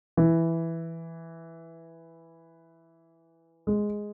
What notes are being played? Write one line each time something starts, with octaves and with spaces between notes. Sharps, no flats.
E3
G#3